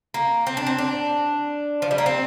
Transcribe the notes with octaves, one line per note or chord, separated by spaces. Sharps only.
A#3
C4
D4
C4
D4
F3
G3
A#3
C4